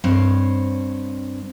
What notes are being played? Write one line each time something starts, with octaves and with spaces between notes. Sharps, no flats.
G2 C4 C5 C#5